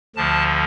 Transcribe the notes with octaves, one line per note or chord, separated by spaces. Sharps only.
D2 D3 F3 A5